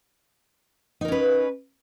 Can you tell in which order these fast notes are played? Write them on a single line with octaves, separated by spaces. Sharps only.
D#4 A#4 C#4 B4